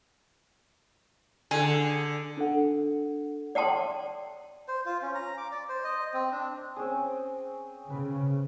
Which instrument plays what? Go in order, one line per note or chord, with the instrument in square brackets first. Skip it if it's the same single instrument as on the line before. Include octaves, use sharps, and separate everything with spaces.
[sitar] D3 [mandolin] G#4
[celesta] D4 A4 F#5
[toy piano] D5 F#5 G5 A5 C6
[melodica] C5
F4
C#4
A#5
D6
D5
C5
D#5
C4
D4
[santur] C4 C#4 G#4
[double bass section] C#3 [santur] B4